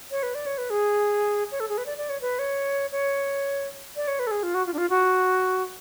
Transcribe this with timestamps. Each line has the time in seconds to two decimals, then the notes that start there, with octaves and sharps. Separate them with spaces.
0.11 C#5
0.23 B4
0.35 D5
0.46 C#5
0.58 B4
0.70 G#4
1.51 C#5
1.60 A4
1.69 G#4
1.78 B4
1.86 D5
1.98 D5
2.09 C#5
2.21 B4
2.39 C#5
2.91 C#5
3.96 D5
4.08 C#5
4.19 B4
4.27 A4
4.31 G#4
4.43 F4
4.54 F#4
4.66 F4
4.74 D4
4.78 F4
4.90 F#4